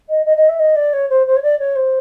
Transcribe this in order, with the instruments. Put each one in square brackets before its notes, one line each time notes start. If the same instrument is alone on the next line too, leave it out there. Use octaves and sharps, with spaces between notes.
[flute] D#5
D#5
D#5
E5
D#5
D5
C#5
C5
C5
C#5
D5
C#5
C5